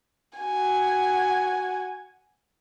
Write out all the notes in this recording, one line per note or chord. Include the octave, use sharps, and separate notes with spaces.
F#4 G#5